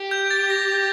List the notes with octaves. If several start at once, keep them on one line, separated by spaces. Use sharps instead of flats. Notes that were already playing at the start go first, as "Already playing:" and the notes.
Already playing: G4
G6
A6
A#6